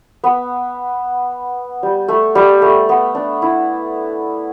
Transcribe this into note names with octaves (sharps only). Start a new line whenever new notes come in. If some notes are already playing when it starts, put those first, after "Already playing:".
B3
G3
A3
G3
A3
B3
D4
E4